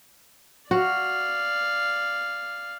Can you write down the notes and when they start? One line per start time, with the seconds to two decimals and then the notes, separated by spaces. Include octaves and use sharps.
0.71 F#4 D5 F5